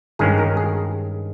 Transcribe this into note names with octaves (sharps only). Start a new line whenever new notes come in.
G2 D#3 G#3 C#4 G#4
A#4
G#4